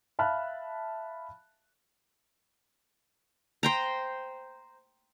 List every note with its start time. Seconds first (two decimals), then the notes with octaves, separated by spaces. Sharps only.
0.19 E5 F5 A5 B5 F6 F#6
3.63 C5 G5 A#5